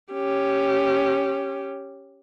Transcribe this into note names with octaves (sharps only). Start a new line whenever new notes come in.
C#4 G4